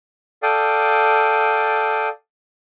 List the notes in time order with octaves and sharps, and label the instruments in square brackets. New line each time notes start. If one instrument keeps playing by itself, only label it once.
[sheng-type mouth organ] A4 D5 F5 G5 D#6